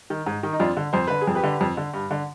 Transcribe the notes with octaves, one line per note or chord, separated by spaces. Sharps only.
D#3
G#2
D#3
D#4
F2 D4 F4
D3
F2 C5
D3 B4
G#4
F2
G4 B4
D3
F2
D3
G2
D3